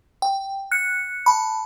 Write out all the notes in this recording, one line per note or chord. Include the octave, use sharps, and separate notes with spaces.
G5
F#6 C#7
A5 B5